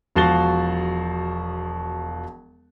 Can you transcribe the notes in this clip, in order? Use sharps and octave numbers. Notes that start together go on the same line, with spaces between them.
E1 F3 F#4 F5 A6 G7